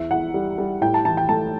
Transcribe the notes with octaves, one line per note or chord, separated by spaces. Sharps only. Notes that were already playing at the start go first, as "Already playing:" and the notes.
Already playing: E2 E5
E2 F#5
G3
G3
A2 G5
A5
E3 A5
G5
A3 A5